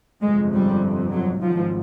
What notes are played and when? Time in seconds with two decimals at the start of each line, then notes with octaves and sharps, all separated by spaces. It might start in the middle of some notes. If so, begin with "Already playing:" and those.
0.22 G1 F2 C3 G#3
0.53 G3
1.12 F#3
1.42 G#1 G#2 F3